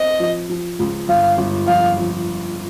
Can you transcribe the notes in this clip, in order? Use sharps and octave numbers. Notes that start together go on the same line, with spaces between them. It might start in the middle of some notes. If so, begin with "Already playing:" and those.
Already playing: C4 D#5
F3
F3
C#2
G1 F5
G1
F2 F5
F2